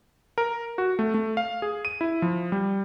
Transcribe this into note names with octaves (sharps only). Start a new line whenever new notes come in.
A#4
F#4
A3
A3
F5
G#4
D#7
E4
F3
G3